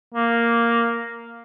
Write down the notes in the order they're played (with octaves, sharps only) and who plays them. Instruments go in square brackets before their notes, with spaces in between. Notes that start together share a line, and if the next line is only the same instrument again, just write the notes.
[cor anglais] A#3